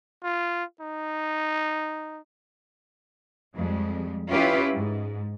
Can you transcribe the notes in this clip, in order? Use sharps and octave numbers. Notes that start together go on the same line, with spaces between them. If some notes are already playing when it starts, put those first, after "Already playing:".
F4
D#4
F2 G3 G#3
C#4 E4 F4 G4 B4
G#2